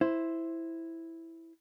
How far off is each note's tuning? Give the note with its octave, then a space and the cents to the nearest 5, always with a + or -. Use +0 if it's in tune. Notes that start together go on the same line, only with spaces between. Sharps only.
E4 +0 C5 +0